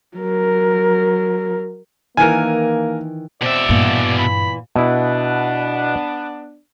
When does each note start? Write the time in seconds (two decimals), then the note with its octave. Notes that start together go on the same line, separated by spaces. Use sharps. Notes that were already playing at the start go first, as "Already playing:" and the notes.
0.17 F#3 A#4
2.17 D#3 E3 A#3 A#4 G#5
3.42 B2 C4 D5 E5
3.69 G2 A#2 E3 B3
4.18 B5
4.76 B2 B3 D4 E4